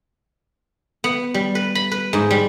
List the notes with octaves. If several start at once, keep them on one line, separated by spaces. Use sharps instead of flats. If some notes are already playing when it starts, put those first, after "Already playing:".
B3
G3
B4
B5
B4
G#2
G3